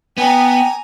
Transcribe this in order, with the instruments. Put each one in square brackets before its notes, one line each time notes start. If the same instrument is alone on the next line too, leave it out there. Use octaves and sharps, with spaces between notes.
[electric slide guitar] B3 [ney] G5 [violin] G#5 A#5